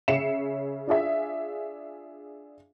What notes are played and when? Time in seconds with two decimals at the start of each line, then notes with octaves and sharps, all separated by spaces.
0.08 C#3 C#4 E5 C7 C#7 E7
0.87 D4 F4 G#4 E5